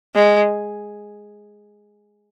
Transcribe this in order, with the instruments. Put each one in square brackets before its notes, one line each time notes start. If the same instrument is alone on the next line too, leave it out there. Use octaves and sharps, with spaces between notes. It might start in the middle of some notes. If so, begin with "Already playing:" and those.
[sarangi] G#3